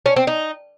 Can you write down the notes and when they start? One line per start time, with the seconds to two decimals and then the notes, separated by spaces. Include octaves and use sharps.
0.06 C#4
0.16 C4
0.27 D#4